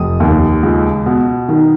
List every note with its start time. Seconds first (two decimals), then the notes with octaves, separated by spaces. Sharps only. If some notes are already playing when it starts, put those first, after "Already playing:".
Already playing: F1 D#6
0.20 D#2
0.63 C#2
1.06 B2
1.49 D#3